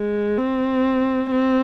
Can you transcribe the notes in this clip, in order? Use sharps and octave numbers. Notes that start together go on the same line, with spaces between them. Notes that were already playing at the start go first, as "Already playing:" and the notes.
Already playing: G#3
C4
C4